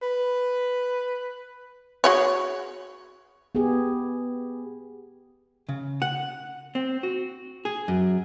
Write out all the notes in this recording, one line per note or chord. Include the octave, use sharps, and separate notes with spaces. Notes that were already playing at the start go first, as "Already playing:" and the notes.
B4
F#4 G#4 C#5
B3 G4 G#4
C#3
F#5
C4
F#4
G#4
F#2